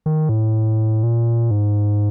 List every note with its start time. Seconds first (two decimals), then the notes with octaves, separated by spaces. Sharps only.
0.06 D#3
0.29 A2
1.03 A#2
1.51 G#2